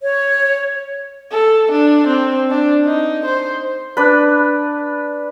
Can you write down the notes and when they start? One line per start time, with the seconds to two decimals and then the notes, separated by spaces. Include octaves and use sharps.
0.01 C#5
1.32 A4
1.72 D4
2.07 C4
2.50 D4
2.86 D#4
3.26 C5
3.97 D4 B4